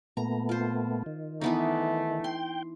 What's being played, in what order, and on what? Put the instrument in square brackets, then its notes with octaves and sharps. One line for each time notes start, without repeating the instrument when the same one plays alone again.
[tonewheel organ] A#2 A3 B3 [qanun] A#5
[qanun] F4 C5
[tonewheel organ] D#3
[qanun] E3 B3 D#4 [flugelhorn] A3
[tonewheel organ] G5 [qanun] C6